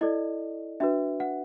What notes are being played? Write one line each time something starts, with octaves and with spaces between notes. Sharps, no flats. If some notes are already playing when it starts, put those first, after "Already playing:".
E4 A4 D5 D#5
D4 F#4 B4 E5
F#5